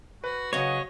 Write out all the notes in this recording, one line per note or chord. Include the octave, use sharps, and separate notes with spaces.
F#4 B4
C#3 F#3 C#5 D#5